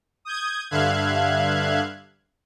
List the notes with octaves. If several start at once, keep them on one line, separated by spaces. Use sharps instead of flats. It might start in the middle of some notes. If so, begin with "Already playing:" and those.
D#6 G6 G#6
G2 D3 E5 F5 F#6 G#6